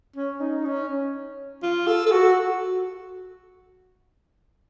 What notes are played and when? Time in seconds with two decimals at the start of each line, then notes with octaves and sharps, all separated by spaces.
0.16 C#4
0.41 D#4
0.65 C#4
1.63 F4
1.87 A4
2.06 A4
2.11 F#4